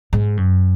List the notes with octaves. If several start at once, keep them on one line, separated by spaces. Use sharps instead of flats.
G#2
F#2